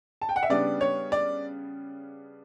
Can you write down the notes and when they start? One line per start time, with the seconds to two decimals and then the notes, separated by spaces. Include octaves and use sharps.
0.21 A5
0.29 G5
0.36 F#5
0.43 E5
0.50 C#3 G3 B3 D4 D5
0.81 C#5
1.12 D5